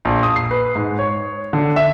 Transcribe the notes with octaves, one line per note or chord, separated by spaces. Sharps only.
A#1
D#6
C7
B4
G#2
C#5
D3
E5